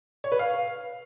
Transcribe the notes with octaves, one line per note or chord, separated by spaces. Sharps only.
C#5
B4
F5